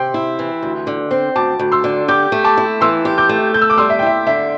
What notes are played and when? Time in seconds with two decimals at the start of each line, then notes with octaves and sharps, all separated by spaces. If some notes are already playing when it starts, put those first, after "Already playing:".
Already playing: C3 G5 C6
0.14 E4
0.39 E3
0.63 D2
0.87 D3
1.11 C4
1.36 D2 A5 D6
1.59 D2
1.72 C6 E6
1.84 D3
2.08 G4 D6 G6
2.32 A3
2.44 A5 D6
2.57 E4
2.81 E3 C6 E6
3.05 G4
3.18 D6 G6
3.29 A3
3.54 A4 G6
3.62 E6
3.70 D6
3.78 G3 C6 E6
3.90 E5
3.99 G5
4.03 E4 E5
4.27 D3 E5